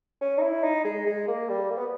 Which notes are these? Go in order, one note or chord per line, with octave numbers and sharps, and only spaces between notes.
C#4
D#4
E4
D#4
G#3
G#3
A#3
G3
A#3
B3